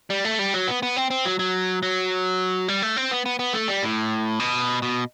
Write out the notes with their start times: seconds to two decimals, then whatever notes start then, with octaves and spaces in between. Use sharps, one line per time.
0.10 G3
0.25 A3
0.39 G3
0.54 F#3
0.68 B3
0.83 B3
0.96 C4
1.11 C4
1.25 F#3
1.39 F#3
1.83 F#3
2.68 G3
2.82 A3
2.97 C4
3.11 B3
3.26 B3
3.39 B3
3.53 A3
3.68 G3
3.83 A2
4.40 B2
4.82 B2